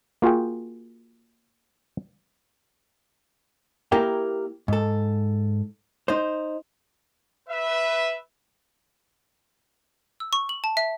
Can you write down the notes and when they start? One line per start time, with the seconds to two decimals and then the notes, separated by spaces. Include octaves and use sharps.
0.22 A#3 F4 F#4 G#4 G5
3.92 A#3 E4 G4 A#4 G5
4.68 G#2 A4
6.08 D#4 C5
7.49 B4 E5
10.20 E6
10.33 C#6
10.49 F#7
10.64 A5
10.77 E5